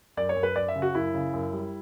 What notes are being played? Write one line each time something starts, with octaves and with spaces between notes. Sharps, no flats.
F#2 D5
C#5
F#2
B4
F#2 D5
E5
C#3
F#4
F#2 E4
C#3
F#2
G3